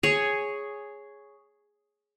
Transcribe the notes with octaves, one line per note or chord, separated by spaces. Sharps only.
G#4 C#5